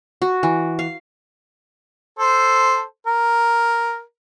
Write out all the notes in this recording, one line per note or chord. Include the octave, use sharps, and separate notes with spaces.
F#4
E3
F5
A4 C5
A#4